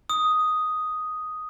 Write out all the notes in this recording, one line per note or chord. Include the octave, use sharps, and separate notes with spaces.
D#6